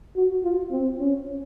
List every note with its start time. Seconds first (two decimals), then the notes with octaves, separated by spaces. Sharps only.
0.16 F#4
0.43 F4
0.71 C4
1.00 C#4